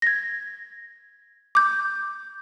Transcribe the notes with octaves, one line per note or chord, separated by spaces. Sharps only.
G#6 A#6
D6 G6